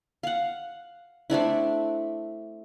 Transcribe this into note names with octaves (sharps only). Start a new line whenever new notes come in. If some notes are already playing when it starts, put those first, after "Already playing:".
F5 F#5
A3 C4 D4 E4